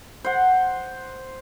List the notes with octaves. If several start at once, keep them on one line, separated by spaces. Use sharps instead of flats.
C5 F#5